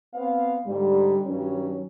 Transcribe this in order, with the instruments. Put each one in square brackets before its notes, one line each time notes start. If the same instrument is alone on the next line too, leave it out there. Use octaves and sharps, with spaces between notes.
[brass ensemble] B3 C4 F5
G#2 D3 G3
G2 D#3 F#3 C#4